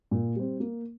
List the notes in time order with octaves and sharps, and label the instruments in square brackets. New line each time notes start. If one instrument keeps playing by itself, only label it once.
[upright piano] A#2
G3 C4
A#3